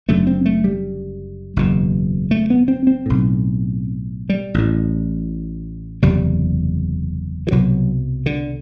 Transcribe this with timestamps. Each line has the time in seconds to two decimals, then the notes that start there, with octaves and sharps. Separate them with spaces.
0.08 F#1 F#2 D3 A3
0.27 C4
0.46 A3
0.64 G3
1.56 F#1 E2 B2
2.31 A3
2.50 B3
2.68 C4
2.87 C4
3.06 B1 A2
4.29 G3
4.54 A1 A2
6.02 F#1 E2 C3 G3
7.47 E3
7.51 C2 B2 F#3
8.26 D3